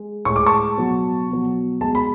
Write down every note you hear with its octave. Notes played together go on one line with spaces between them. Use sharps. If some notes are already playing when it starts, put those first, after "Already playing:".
Already playing: G#3
A2 G#3 C#6
D6
A5 C#6
B2 F#3
B2 F#3
B2 G#3 A5
B5